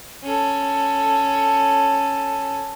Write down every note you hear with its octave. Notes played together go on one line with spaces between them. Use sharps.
C#4 A4